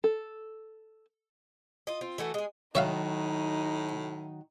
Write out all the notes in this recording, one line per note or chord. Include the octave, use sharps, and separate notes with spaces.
A4
F4 D#5
C4 F4
E3 A3 F#4 A4
G#3 G#4
A2 D#3 F#3 D#4 F#4 C#5 E5 F5